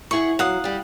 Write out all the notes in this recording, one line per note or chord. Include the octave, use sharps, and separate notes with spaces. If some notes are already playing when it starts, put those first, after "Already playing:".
E4 G#4 F#5 C#6
F#3 F5 F#5 D#6
G3 G4